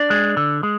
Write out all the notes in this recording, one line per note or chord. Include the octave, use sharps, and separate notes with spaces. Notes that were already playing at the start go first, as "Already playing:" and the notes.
Already playing: D4 D5
G#3
D3
G#3